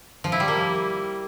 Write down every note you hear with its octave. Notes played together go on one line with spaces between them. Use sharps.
F3
E4
G3
A#3